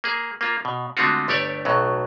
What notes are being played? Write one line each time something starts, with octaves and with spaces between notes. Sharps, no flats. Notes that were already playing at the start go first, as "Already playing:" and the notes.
A#3 G#4
A#3 F4
B2
D3 G#3 A3 C4 F4 F#4
G1 A3 G4 C#5 D5
B1 A2 F#3